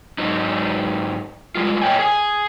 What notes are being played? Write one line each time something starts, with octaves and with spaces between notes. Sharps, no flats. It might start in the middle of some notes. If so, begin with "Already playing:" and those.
G#2 F#3 D#4
G3 G#3 F4
A#2 C#5 D#5 G5 G#5
G#4 G#5